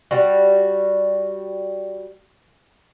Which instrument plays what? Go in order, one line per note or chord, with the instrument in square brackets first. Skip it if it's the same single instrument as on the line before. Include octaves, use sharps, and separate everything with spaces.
[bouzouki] G3 F#4